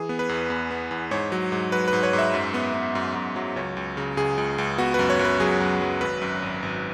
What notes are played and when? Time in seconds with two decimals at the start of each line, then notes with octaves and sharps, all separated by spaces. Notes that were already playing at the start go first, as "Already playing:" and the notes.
Already playing: E3 G#4
0.09 B3
0.19 B4
0.29 E2
0.50 E2
0.71 B3
0.91 E2
1.11 G#2 C#5
1.32 F#3
1.52 G#2
1.72 F#3 B4
1.88 B4
1.93 G#2
2.03 C#5
2.13 G#2
2.19 E5
2.34 F#2
2.54 B3
2.74 B3
2.95 F#2
3.15 F#2
3.36 F#3
3.56 C#2 C#5
3.77 C#2
3.97 C#3
4.17 C#2 G#4
4.38 C#2
4.58 C#2
4.78 B3 F#4
4.94 F#2 B4
5.10 C#5
5.19 F#2
5.25 B4
5.40 F#3 G#4
5.60 F#2
5.81 F#3
6.01 G#1 B4
6.22 F#2
6.42 G#1
6.63 G#1